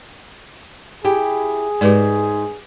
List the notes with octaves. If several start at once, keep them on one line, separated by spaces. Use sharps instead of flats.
E4 G4 G#4
G#2 G4 B4 D5